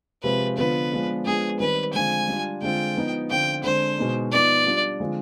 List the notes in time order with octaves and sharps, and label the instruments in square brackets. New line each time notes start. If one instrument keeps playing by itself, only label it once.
[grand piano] C3 F3 G#3 C4 F4 [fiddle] B4
[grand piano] D3 F3 B3 F4 [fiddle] B4
[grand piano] F3 G#3 B3 D4 F4
[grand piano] F3 G#3 B3 D4 [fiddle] G#4
[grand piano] D#3 G3 C4 D#4 [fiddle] B4
[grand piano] D3 F3 G#3 C4 F4 [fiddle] G#5
[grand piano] G3 D4 F4
[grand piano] D3 G#3 C4 F4 [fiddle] G5
[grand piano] F3 B3 D#4
[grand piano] D3 F3 C4 F4 [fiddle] G5
[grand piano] D3 G#3 C4 [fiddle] C5
[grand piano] B2 G#3 B3 D#4
[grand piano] F3 B3 D#4 [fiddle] D5
[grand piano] G3 D4 F4
D3 F3 G#3 C4 F4